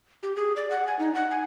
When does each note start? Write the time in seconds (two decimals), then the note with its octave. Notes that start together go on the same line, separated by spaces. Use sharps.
0.23 G4
0.36 G#4
0.56 D5
0.70 F#5
0.87 G#5
0.99 D#4
1.15 F#5
1.31 G#5